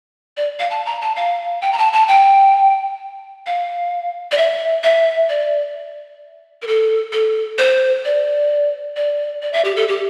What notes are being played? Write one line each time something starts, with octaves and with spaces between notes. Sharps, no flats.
D5
F5
A5
A#5
A5
F5
G5
A#5
A5
A5
G5
F5
D5
E5
E5
D5
A#4
A4
A4
C5
D5
D5
D5
E5
G4
A4
G4